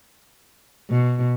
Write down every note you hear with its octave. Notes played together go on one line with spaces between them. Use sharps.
B2